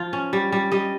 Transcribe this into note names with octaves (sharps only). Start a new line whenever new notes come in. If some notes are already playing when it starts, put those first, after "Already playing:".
Already playing: F3 F4
C#4
G3
G3
G3 D#5